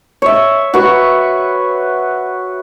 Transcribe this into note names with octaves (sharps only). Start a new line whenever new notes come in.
C#5 E5
F#4 B4